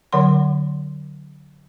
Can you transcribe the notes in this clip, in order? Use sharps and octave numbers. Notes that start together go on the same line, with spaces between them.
D3 F#3 C#5 F#5 C6